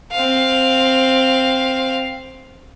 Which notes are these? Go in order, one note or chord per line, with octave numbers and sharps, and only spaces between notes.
C4 F5